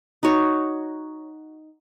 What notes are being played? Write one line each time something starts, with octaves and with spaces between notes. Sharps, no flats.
D#4 F#4 C#5